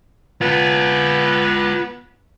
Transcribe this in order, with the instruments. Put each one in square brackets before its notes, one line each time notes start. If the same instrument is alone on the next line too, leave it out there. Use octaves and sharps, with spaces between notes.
[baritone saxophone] B3 [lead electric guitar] F4 B4